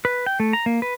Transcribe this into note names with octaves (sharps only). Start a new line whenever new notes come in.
B4
G5
A3
A#5
A#3
B4